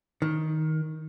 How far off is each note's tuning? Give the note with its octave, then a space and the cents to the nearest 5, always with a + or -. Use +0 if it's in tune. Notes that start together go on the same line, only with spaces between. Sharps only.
D#3 +10